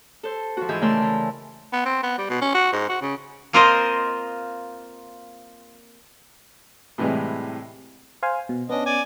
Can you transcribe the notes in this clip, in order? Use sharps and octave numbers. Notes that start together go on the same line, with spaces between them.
A4 C5
F3 F#4
G#2 E3 G#4 E6 G6
C#3 A3 A#4 D5 C6 E6
E3
B3
C4
B3
G3
B2
C#4
F#4
G#2
F#4
C#3
A#3 C4 F4 A#4 C5 D#5
A2 C3 E3 G3 G#3
C5 F5 G#5
B2
B3 C#4 D4 D#5
D5 G#5